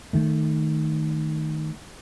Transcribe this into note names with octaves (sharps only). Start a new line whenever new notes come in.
D#3 A3